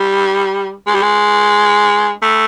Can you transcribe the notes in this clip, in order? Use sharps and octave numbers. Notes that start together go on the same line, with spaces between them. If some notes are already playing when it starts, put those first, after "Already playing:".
Already playing: G3
G#3
G3
G#3
A3